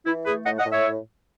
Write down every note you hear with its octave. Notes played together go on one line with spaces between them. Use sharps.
E3 E4
A3 G#4 B4
A2 D#5 F#5
D#5 F#5
A2
C#5 E5